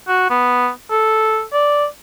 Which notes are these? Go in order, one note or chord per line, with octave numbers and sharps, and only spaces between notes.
F#4
B3
A4
D5